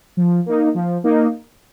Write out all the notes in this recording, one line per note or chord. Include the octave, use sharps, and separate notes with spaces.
F3
A#3 D#4
F3
A#3 D#4